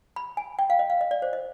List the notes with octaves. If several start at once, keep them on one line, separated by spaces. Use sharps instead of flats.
B5
G#5
G5
F5
D#5
F5
D#5
D5
C5
D#5